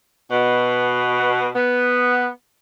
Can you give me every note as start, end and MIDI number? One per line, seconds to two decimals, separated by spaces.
0.31 1.50 47
1.56 2.29 59